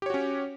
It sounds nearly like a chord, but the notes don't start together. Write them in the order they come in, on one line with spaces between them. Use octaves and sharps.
G4 C#5 F#4 C#4